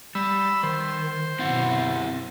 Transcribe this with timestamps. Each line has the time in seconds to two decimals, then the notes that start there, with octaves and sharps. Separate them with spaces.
0.15 G3 B5 E6
0.63 D#3 C5
1.39 F#2 B2 C4 E4 F#5